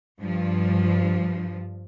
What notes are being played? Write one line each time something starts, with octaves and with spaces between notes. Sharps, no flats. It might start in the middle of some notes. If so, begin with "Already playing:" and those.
G2 F3